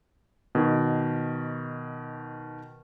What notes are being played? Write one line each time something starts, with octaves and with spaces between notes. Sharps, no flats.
B2 D#3